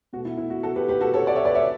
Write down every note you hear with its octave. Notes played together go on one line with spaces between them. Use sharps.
B2 A3 F#4
E4
E4
F#4
F#4 A4
G4 B4
G4 B4
F#4 A4
A4 C#5
D5 F#5
C#5 E5
B4 D5
C#5 E5